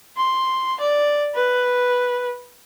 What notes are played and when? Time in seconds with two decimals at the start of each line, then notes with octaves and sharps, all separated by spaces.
0.17 C6
0.80 D5
1.35 B4